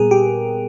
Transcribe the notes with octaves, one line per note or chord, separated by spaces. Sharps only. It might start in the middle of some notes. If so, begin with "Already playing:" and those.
Already playing: A#2 G3 B3 G#4 A#4
G4